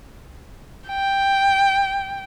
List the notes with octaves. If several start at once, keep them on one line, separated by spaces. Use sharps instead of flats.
G5